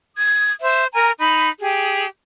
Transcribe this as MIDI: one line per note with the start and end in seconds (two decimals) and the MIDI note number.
0.16 0.51 87
0.16 0.51 92
0.61 0.86 72
0.61 0.86 76
0.93 1.11 70
0.93 1.11 80
0.93 1.11 82
1.18 1.48 63
1.18 1.48 83
1.60 2.06 67
1.60 2.06 68